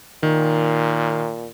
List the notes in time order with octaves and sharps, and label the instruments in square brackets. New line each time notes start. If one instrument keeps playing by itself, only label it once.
[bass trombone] A#2 [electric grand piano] D#3